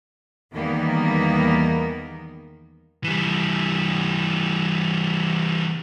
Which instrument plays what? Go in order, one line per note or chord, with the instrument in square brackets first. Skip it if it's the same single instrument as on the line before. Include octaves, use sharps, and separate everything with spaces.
[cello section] E2 D#3 G3 A#3 B3
[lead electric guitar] E3 G3